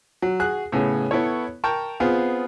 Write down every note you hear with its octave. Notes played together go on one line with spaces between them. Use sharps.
F#3
F#4 G#4 F#6
A2 C#3 B3
B3 E4 A4 C#5
A#4 G5 A5 C#6
B3 C4 F4 G#4